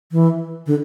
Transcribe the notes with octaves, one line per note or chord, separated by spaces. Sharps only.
E3
D3